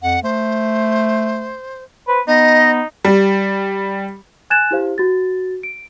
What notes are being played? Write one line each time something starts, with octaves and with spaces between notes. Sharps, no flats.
F2 F#5
A3 C5
B4 C5
B3 D#4 D#5
G3
G#5 F#6 G#6 A6 E7
E4 G4 C5 F5
F#4 A6
D7